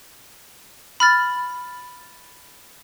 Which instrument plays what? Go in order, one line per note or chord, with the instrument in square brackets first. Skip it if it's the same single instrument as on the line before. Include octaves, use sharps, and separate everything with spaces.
[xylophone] B5 F6 A6